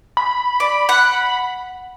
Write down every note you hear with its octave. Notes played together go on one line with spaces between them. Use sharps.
B5
D5
F#5